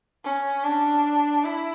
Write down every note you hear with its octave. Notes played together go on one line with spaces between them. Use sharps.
C#4
D4
E4